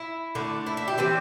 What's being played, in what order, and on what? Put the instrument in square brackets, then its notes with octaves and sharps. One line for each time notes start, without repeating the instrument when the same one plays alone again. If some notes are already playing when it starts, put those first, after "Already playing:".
Already playing: [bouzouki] E4
D3 A3 D4
E4
E4
G4
E3 G3 C4 D4